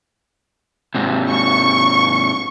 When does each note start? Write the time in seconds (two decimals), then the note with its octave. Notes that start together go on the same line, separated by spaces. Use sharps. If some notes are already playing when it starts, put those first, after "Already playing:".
0.95 G#2 C3
1.30 C#6